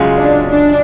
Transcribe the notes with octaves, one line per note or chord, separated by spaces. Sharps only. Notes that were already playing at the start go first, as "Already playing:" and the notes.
Already playing: F#2 C#3 G#3 C#4 F4
D4
D4